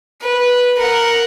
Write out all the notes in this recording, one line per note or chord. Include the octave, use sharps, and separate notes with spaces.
B4
A#4 F#5